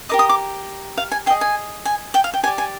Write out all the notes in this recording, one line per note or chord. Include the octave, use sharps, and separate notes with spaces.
G4 A#4 D#5 D6
D#6
D6
F5
G#5
G#4 D#5 G5
G#5
G#5
G5
F5
G5
G4 D5 G#5
G#5